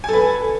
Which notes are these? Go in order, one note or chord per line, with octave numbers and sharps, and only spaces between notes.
A4 B4 G#5